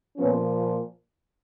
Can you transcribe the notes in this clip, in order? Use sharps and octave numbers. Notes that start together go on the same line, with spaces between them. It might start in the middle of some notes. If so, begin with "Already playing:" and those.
A#2 F3 B3 C#4